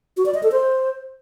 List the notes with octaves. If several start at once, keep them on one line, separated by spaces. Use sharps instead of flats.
F#4
D5
D#5
A4
C5